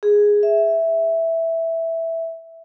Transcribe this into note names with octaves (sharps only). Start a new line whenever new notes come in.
G#4
E5